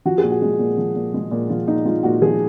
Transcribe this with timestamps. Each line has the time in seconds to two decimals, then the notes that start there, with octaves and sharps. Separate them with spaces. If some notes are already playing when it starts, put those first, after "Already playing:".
0.05 F3 F#4
0.18 G#4
0.23 A#2
0.31 F#4
0.42 G#3
0.59 A#2
0.78 F3
0.96 A#2
1.14 G#3
1.31 A#2
1.49 F3 F4
1.67 A#2 D#4
1.85 G#3 F4
2.03 A#2 F#4
2.21 F3 G#4